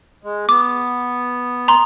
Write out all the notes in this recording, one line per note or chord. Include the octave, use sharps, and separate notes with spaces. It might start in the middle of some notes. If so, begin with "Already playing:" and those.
G#3
B3 D6
A#5 C6